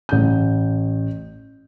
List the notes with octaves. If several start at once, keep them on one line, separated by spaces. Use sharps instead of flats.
A1 G6